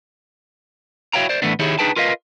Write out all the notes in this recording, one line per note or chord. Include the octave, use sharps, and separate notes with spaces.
E4 F#4 C#5 F5 G5 A#5
C5 D5
A2 E3 A3 B3 D4
D#3 D#4 E4 G4 G#4 C#5
D4 D#4 G#4 B4 G5 A5
F4 A#4 B4 D#5 F5